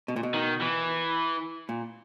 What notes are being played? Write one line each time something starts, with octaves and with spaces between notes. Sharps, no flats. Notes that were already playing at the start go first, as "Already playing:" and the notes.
B2
A#2
B2
D#3
E3
A#2